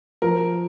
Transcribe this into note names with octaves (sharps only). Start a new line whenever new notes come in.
F3 A#4